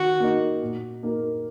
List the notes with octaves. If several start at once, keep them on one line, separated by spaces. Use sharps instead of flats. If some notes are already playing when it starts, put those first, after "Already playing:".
Already playing: D#3 F#4
A#3 D#4
A#2
A#3 D#4 A#4